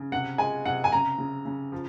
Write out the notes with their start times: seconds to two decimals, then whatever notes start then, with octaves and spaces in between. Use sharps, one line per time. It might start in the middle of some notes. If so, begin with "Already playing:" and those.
Already playing: C#3
0.12 C3 F#5
0.38 G#3 G#5
0.65 C3 F#5
0.84 G#5
0.92 C#3 A#5
1.18 C#3
1.45 C#3
1.72 F3